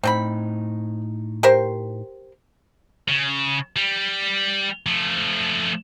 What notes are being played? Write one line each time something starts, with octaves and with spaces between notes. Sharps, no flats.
A2 C4 D#4 G5 B5
G4 A#4 C5
C#3
G3
F3 A3